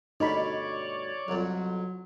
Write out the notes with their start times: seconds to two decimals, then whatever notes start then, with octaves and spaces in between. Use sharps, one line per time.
0.20 D2 G2 B2 D#4 C#5 D5 B5
1.28 C2 F2 F#3